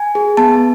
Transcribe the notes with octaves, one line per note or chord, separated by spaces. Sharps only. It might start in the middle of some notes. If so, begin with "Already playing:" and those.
Already playing: G#5
G#4
B3 A5